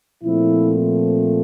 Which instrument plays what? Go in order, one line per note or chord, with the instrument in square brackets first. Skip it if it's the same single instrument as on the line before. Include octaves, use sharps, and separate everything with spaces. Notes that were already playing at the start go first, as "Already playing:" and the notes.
[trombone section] A#2 F3 A3 C4 E4